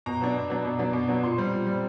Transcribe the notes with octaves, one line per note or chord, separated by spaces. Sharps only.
B2 A#5
F#3 B3 D4
B2
F#3 B3 D4
B2
F#3 B3 D4
B2
F#3 B3 D4
A#2 C6
G3 C4
A#2
G3 C4